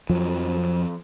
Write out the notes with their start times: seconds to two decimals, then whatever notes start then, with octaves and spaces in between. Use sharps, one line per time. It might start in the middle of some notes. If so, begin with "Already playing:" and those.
0.09 F2 F3 F#3